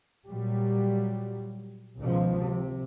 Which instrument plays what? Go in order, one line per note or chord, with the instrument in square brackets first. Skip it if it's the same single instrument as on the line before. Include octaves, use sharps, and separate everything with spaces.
[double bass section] A#2 F#3 G3
C#2 B2 D#3 F3
C3